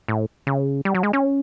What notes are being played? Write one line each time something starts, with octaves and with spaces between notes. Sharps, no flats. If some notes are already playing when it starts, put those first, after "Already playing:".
A2
C#3
G3
F#3
G#3
C#4